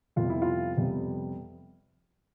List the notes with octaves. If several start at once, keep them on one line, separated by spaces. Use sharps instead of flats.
F2 C3 G3 B3 F4
E4
F4
F2 C3 G3 B3